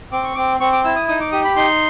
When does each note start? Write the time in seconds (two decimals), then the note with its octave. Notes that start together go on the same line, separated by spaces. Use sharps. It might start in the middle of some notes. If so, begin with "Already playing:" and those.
0.12 C4 D6
0.24 C#6
0.35 C4 D6
0.60 C4 C#6
0.72 D6
0.84 E4 E6
0.96 D#6
1.08 D#4 D#6
1.21 D6
1.32 G4 D#6
1.44 B5
1.56 D#4 C6